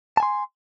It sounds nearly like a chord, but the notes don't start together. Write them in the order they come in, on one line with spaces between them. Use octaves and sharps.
A5 G#5 C6